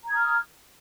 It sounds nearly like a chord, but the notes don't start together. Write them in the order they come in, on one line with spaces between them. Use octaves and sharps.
A#5 G#6 D#6 F6